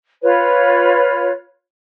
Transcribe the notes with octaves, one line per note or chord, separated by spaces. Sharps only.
F4 B4 C#5